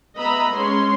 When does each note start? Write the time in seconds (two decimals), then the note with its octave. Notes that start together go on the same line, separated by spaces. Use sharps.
0.17 B3 D#5 E5 A#5 B5
0.56 G#3 C#4 C#5 C6